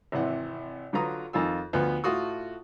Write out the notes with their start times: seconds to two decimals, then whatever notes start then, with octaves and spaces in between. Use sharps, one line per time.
0.12 G#1 C3 E3 F#5
0.93 D3 F#3 F4 B4 A#5 D#6
1.33 F2 D#3 D#4 F4 G#5 E6
1.73 D2 F3 B3
2.04 A2 A3 F4 F#4 D#6